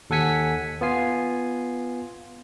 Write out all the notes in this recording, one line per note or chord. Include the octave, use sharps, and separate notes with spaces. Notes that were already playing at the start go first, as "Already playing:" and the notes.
D#2 A4 F#5 G#5 B6 C#7
B3 F4 G#5 C7